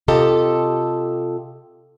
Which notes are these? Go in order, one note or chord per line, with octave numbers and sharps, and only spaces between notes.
C3 F4 G4 A4 D#5